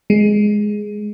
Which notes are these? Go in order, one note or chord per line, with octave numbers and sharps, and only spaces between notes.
G#3